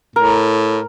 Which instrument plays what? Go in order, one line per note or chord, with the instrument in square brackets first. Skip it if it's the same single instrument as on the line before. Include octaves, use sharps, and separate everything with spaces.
[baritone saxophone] A2 [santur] A#4